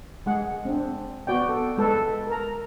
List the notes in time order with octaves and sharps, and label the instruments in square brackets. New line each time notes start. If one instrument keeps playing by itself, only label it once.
[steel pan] G#3 G#4 F#5
C4 D4
B3 F#4 D5 G5
A4
G#3 A4 B4
A#4 A#5